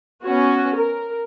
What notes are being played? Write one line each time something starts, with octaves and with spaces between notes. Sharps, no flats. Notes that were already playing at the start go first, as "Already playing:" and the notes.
B3 C#4 F#4
A#4